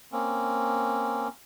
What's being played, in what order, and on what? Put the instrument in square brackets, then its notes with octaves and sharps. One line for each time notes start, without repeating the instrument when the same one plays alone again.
[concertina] A#3 C4 C#4